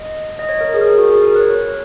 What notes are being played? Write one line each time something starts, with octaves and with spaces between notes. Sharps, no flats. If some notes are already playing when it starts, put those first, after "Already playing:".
Already playing: D#5
D#5
C#5
A#4
G#4
A#4
G#4
F#4
G#4
A#4
B4
C#5